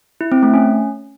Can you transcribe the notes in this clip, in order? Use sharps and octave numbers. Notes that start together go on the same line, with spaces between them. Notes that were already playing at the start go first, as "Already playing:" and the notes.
E4
C4
A3
C#4